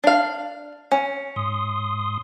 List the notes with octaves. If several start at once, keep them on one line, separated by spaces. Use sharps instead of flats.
D4 F5
C#4
G#2 C6 D#6